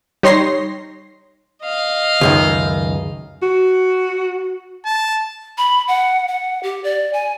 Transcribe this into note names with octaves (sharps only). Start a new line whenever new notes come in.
G3 D#4 C#5 C6 A#6 C7
D#5 F5
C#2 F#2 D#3
F#4
A5
B5
F#5
F#5
G4
D5
G#5